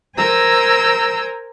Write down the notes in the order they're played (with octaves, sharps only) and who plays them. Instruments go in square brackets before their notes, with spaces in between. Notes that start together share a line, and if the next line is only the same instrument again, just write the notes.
[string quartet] A#4 C5 G#5 A#5 E6 G6